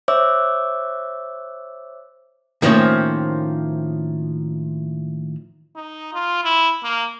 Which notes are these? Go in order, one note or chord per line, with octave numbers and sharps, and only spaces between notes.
C5 C#5 E5 D6 E6
A2 D#3 F3 A#3 C4 C#4
D#4
F4
E4
A#3